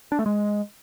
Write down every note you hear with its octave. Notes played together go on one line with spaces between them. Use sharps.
D4
A3
G#3